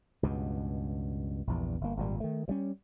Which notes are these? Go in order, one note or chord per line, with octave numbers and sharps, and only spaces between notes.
C#2 G2 B2
A#1 E2 G2
G1 A#3
G#1 A#2 G3
D#3 A3
G2 G3 C#4